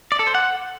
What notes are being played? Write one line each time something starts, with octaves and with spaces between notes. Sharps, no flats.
D5
A4
C5
F#5